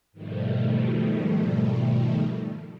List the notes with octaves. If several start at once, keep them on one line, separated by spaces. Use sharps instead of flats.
G#2 B2 D#3 F3 G3 A3